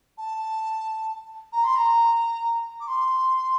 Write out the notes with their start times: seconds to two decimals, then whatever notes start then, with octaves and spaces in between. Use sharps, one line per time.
0.17 A5
1.52 A#5
1.63 C6
1.75 A#5
2.80 D6
2.87 C6